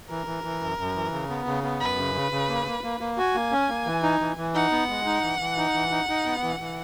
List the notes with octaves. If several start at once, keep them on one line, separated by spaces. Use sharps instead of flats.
E3 A#4
E3
E3
F#2
F#2
E3
C#3
B3
C#3
B3
F#2 B4
C#3
C#3
C#3
A#3
A#3
A#3
A#3
F#4 G#5
A#3
C#4
A#3
E3
D#4
E3
E3
D#4 F#5
B3
G#3
D#4
E3
E3
D#4
E3
D#4
D#4
B3
E3
E3